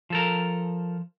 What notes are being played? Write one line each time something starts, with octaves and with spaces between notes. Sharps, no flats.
F3 A4 A#4